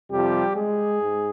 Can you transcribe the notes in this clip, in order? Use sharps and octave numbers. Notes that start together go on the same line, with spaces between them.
F2 C3 F3 G3 G4
G#3 G#4
G#2